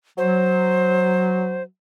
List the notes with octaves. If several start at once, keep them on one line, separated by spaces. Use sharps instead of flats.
F#3 C5